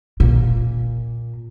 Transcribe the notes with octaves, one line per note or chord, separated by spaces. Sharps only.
A#2